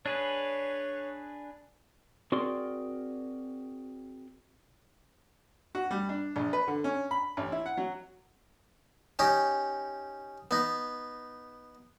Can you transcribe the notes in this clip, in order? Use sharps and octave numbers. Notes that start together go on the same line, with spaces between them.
D4 G#4 B4 C#5
C4 F#4 G#4 A#4 D5 C6
F#4
G3
D4
A#1
B4
D3
C#4
B5
A1
E4
F#5
F#3
C#4 D#4 G4
B3 D#4